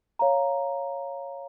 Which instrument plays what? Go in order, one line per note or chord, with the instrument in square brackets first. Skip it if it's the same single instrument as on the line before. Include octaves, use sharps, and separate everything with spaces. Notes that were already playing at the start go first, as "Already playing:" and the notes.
[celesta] C#5 F5 A#5